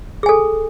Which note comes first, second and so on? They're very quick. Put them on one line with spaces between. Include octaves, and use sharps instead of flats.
G#4 G#5 A4